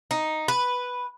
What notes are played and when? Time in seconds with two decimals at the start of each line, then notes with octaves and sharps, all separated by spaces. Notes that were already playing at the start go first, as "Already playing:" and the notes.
0.11 D#4
0.48 B4